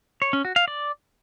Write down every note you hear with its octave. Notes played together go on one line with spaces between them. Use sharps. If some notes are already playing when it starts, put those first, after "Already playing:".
C#5
C#4
F#4
F5
D5